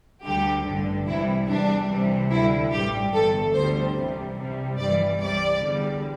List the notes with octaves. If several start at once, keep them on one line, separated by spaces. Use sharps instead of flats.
D2 D3 G3 G4
A1 G2 D3
C2 C3 E3 G3 E4
E2 E3 G3 D4
C2 C3 E3 G3
D2 D3 G3 E4
A1 G2 G3 G4
G1 G2 E3 A4
D2 D3 G3 C5
C2 C3 E3 G3
C2 C3 G3
G1 G2 E3 G3 D5
C2 C3 G3 D5
E2 D3 G3